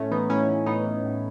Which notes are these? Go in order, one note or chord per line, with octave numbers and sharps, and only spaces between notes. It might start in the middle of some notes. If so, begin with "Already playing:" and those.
Already playing: A2 A3 C#4
E3 B3 D#4
A2 C#4 E4
E3
A2 B3 D#4
E3
A2